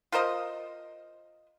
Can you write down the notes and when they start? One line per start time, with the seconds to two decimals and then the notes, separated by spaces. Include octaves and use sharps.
0.12 F4 A#4 C5 D#5